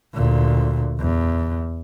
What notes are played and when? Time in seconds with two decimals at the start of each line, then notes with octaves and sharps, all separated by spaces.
0.14 D2 A#2
0.99 E2